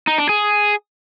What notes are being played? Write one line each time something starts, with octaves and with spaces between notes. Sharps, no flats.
D#4
D4
G#4